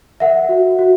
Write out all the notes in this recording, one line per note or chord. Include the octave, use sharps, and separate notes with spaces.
A#4 E5 F#5
F#4
F#4